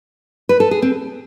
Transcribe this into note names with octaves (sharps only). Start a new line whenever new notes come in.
B4
A4
G#4
C4